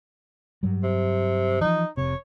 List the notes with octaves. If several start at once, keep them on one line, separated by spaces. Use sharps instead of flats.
G2 F#3 G3
C3
E3 F3 D#4
F1 C3 C#5